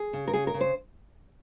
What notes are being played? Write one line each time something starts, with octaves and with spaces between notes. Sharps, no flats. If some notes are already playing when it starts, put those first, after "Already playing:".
Already playing: G#4
C#3
A#4
C#3 G#4
A#4
C#3
C5